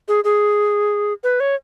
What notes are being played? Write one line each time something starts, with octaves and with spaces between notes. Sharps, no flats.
G#4
G#4
B4
C#5